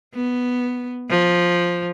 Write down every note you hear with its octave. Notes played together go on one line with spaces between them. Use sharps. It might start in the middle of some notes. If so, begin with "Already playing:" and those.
B3
F3